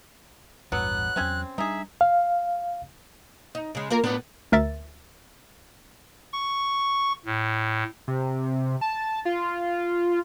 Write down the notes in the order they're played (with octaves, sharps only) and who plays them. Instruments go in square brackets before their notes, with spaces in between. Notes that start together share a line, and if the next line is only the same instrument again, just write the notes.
[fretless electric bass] A1 E2 G2 [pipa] F#3 B3 [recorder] F#6
[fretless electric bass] E2 F#3 [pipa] C4 C#4 G#5
[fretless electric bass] G3 D4 [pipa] D#4 G#4 [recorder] E5
[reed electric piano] F5
[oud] D#4
C#3 G#3
A#3 F4 A#4
A2 B3 D4
[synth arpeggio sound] D2 A#4 E5 A6
[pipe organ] C#6
A2
[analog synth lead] C3
A5
F4